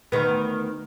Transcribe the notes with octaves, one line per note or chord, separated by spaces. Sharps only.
D2 D#3 B3